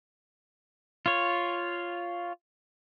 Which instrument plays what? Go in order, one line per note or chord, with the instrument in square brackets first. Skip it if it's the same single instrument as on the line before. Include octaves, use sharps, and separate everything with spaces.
[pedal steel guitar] F4 C#5